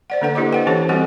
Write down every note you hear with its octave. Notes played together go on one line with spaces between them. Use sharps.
C5 D5 F#5
D3 A#3 D4 A4 B4 F#5
A#3 E4 G4 D#5 D6
C5 F#5 G5
E3 C#4 G4 A4 C5 C#5
G3 C4 F#4 A4 D#5 F#5